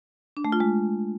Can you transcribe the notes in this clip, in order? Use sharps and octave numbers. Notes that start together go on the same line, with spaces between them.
D4
A3
F4
G#3